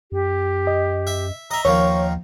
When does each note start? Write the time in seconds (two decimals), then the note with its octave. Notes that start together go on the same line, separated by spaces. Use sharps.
0.12 F#2 G4
0.67 D#5
1.07 E5
1.51 D#5 E5 A#5
1.65 D#2 D#3 F3 A#3 C#5 C#6